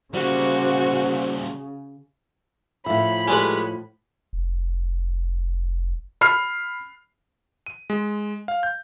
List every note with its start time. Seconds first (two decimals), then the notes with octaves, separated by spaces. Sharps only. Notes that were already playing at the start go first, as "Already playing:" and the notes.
0.14 C#3 G3 A#3 F#4 C5
2.86 A2 F3 E5 B5
3.28 G3 G#3 A4 B4 C#5 G#5
4.33 F1
6.21 B5 F6 C7
7.66 D#7
7.90 G#3
8.48 F5
8.63 G6